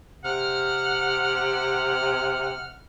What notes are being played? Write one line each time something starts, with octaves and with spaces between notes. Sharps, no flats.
C3 F#5 F6